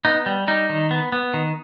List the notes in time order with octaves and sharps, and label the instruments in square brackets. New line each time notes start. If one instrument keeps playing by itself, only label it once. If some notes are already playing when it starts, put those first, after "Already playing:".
[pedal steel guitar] B3 D#4
G3
G3 D#4
D#3
B3
B3
D#3